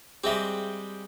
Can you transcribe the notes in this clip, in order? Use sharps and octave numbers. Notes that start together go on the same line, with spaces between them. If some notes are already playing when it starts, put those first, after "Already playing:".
G3 G#3 C4 G#4 C5 E5